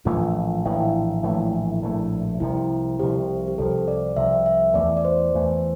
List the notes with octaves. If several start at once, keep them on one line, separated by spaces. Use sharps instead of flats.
A#1 A2 E3 A3 F4
A#1 A2 E3 A3 E4
A#1 A2 E3 A3
A#1 A2 E3 A3
C2 C3 F3 E4
C2 C3 F3 G4
G4
C2 C3 F3 A4
D5
C2 C3 F3 E5
E5
E2 E3 A3 D5
D5
C5
E2 E3 A3